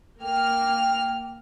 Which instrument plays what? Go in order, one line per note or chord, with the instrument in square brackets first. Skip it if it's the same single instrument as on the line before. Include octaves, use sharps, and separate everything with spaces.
[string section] A#3 F6 [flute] G5